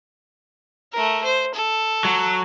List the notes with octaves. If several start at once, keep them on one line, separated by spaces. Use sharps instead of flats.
A3 A#4
C5
A4
F#3